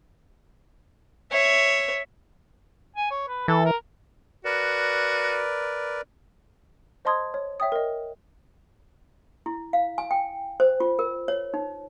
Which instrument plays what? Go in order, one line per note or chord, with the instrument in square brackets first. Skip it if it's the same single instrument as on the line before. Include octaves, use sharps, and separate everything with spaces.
[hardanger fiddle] C#5 E5
[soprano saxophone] G#5
C#5
B4
[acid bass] E3 [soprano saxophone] A4
[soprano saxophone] A#4
[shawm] F#4 [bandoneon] A#4 B4 D5
[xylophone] C5 D#5 A5 C6 D#6 G#6
C#5
C#5 E5 G5 D#6
A#4 D#5
[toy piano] E4
F5
G#5
G5
C5
F4
A#4
C#5
D#4